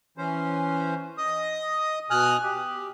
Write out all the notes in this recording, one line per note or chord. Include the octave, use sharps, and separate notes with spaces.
E3 C#4 C5
D#5 D#6
B2 G#5 D#6 F6 F#6
G4